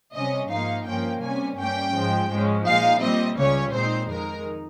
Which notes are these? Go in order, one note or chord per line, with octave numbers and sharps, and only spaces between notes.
C3 G3 C#4 D#5
G#2 F3 A#3 D#4 F5
G2 F3 A#3 C#4 G5
C3 G3 C#4 G#5
G2 G3 A#3 C#4 G5
G#2 F3 G#3
G#2 F3 G#3 C#4
A#2 G#3 D#4 F5
A#2 G3 C4 D#5
C#2 C#3 G3 C#4 C#5
A#2 G#3 C4 D#4 C5
F2 D#3 G#3 D#4 A#4